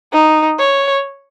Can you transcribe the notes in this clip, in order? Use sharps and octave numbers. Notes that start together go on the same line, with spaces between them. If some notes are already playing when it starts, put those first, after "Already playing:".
D#4
C#5